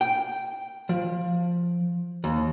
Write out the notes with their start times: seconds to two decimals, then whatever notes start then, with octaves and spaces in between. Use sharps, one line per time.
0.01 G5
0.89 F3
2.24 D#2